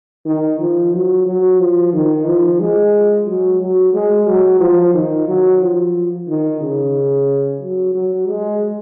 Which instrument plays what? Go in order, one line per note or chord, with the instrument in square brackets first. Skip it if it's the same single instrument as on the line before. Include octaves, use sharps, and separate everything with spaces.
[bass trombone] D#3
F3
F#3
F#3
F3
D#3
F3
G#3
F#3
F#3
G#3
F#3
F3
D#3
F#3
F3
D#3
C#3
F#3
F#3
G#3